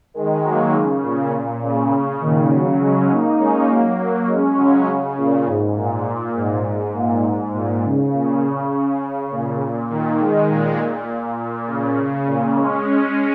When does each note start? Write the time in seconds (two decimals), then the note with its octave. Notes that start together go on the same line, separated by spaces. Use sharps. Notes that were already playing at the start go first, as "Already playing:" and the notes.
0.14 D#3 G#3
0.43 F#3 A#3
0.73 C#3
1.03 A#2
1.32 A#2
1.63 C#3
2.21 A#2 D#3
2.51 C#3 F#3
2.80 G#3 C#4
3.10 A#3 D#4
3.39 G#3 C#4
3.69 F#3 A#3
4.28 G#3 C#4
4.57 C#3 F#3
4.87 C#3
5.17 A#2
5.46 G#2
5.76 A#2
6.35 G#2
6.94 A#2
7.24 G#2
7.53 A#2
7.84 C#3
8.13 A#2
8.42 C#3
9.31 A#2
9.90 A#2 D#3
10.19 D#3 G#3
10.49 A#2
11.38 A#2
11.67 C#3
12.27 A#2
12.56 G#3 C#4
12.86 G#3 C#4